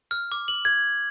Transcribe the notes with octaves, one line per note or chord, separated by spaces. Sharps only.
F6
D6
F#7
G#6